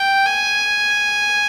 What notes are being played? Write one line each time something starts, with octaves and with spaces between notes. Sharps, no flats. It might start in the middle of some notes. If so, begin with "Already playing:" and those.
Already playing: G5
G#5